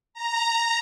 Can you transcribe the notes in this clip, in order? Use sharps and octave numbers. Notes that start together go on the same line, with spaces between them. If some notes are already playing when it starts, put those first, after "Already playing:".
A#5